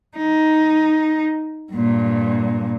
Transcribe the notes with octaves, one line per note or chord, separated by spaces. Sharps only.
D#4
G2 A#2